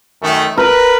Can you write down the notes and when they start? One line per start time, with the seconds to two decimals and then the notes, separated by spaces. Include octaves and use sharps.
0.22 F#2 D#3 A3
0.58 A#4 B4